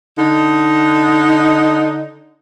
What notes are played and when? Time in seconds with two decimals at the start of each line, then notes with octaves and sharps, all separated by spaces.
0.16 D3 D#4